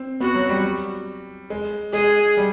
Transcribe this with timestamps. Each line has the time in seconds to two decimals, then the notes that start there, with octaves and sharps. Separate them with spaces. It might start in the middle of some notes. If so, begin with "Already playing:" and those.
Already playing: C4
0.20 B3 F#4
0.35 F#3
0.49 G3
1.50 G#3
1.93 G#3 G#4
2.37 G3